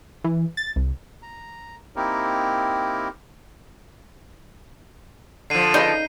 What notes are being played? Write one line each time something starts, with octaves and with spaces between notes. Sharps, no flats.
E3
A6
C2
A#5
A#3 C4 D#4 E4 G4 A#4
D3 F3 C7 D#7
C#3 D#4 B4 D5